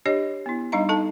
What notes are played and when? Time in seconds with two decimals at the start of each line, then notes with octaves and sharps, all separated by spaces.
0.06 D4 G4 C#5 D#5
0.46 B3 E4
0.72 G3 D4 D#4 D#5 F5 A#5
0.89 D#4 A4 A5